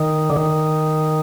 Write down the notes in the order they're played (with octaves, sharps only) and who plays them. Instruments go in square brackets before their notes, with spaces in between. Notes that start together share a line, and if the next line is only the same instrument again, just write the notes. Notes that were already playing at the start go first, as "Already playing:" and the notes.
Already playing: [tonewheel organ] D#3
D3
D#3